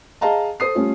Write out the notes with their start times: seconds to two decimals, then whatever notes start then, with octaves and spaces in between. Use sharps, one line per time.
0.21 G#4 D#5 F5 A5 A#5
0.60 A4 C5 D#6 C7
0.75 G3 A3 C#4 F4